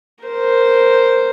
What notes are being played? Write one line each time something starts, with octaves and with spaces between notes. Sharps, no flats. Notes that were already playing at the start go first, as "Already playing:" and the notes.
A#4 C5